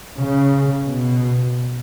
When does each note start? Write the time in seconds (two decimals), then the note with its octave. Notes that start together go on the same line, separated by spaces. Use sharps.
0.20 C#3
0.84 B2